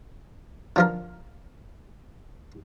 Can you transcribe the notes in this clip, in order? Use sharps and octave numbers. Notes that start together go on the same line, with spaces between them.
D3 F3 A#4